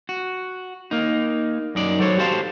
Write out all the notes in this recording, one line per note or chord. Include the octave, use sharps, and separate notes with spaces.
F#4
A#3 D#4
F#2 D#4 D5
F#3 A4 C5 C#5
F#4 G4 A4 C5 F5 A5